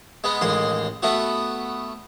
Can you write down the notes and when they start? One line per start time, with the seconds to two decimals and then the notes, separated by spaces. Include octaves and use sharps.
0.24 G#3 B3
0.41 A1 D#2 G#3 C6
1.03 A3 B3 F#4